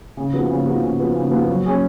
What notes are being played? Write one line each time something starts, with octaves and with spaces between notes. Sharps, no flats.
C#3
F3 B3 F#4
C#3
F3 B3 F#4
C#3
F3 B3 F#4
C#3
F3 B3 F#4
F#3
C#4 G#4